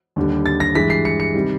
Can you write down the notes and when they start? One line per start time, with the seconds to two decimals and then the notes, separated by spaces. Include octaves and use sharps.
0.16 D#2 D3 G3
0.46 A6
0.60 A#6
0.75 G2 E3 G#3 B6
0.90 C7
1.05 C#7
1.20 C#7
1.35 C3 D#3 G3